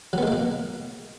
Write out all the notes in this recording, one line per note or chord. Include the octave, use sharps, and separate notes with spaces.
B2 F#3 G#3 A#3 B3